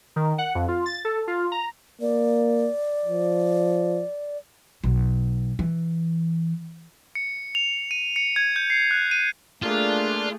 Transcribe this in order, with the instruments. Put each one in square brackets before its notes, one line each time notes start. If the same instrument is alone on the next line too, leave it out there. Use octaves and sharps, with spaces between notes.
[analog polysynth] D#3
F#5
F2
F4
A6
A4
F4
A#5
[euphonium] A#3 [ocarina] D5
[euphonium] F3
[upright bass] B1
E3
[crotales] C#7
F7
D#7
C#7
G#6
G6
C7
F#6
D#7
[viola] A3 G#4 [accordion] A#3 D4 [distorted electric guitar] F4